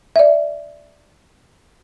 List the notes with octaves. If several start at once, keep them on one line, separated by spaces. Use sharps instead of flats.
D5 E5